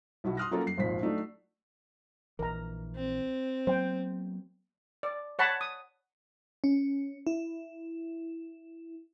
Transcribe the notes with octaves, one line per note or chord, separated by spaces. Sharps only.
B1 E4 F#4
C6 D#6 F6 F#6 A#6
F#3 A#3 C#4 F4 A4 A#4
F#2 C7
G#1 F2 A#2 B6
F#3 A3 D4 D#4
A#1 E3 A#4 A#5
C4
F#3 A#3 B3 C5 G5
D5
C#5 F#5 A5 B5
D#6
C#4
E4